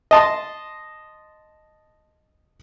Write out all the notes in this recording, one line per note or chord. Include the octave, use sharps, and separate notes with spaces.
D#5 A5 C6